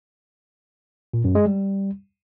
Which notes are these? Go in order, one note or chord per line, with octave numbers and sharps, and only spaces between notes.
A#2
F#2
G#3
G3